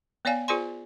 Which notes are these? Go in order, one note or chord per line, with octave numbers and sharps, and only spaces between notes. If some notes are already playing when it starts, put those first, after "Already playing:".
B3 C#5 D5 F5 G#5
F4 G#4 C5 D5 G#5 C6